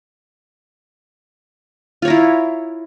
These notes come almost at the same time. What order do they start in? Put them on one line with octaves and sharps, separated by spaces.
F4 C#5 A#4 E4